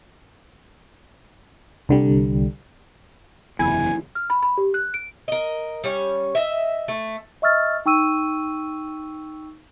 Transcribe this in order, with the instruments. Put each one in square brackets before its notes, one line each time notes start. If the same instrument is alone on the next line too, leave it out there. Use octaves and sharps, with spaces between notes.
[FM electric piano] C2 D3 G3
[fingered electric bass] F#1 E2 C3 [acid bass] E4 [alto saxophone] G#5
[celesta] F6
B5
B5
G4
F#6
D7
[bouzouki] A#4 D#5
G3 C#4 C#5
D#5 E5
A3
[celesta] D#5 E5 C#6 E6 F6 A6
D#4 G5 C#6 E6 D#7